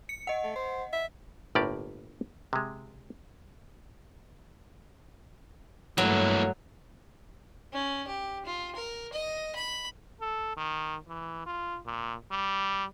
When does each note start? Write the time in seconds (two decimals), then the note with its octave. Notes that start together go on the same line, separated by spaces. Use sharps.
0.09 C#7
0.27 D#5 F#5
0.44 A3
0.56 C5
0.93 E5
1.55 G1 A2 A#3 G4 D5
2.53 C3 G#3
5.98 G2 E3 F#3 A3 A#3
7.73 C#4
8.07 G4
8.45 F4
8.75 A#4
9.13 D#5
9.55 B5
10.21 A4
10.57 D#3
11.08 E3
11.46 F4
11.86 A#2
12.31 G3